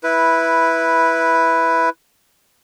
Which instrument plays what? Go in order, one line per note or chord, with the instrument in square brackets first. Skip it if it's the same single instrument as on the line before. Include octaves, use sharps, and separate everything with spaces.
[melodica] E4 B4